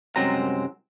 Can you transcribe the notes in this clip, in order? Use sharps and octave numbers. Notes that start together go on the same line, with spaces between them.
C2 F#2 F#3 G#3 C4 A#5